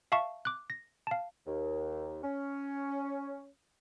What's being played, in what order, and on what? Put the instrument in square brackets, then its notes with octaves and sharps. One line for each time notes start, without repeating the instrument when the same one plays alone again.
[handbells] E5 F5 A5 C#6
D6 F#6
A#6
F5 A5
[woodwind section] D#2
C#4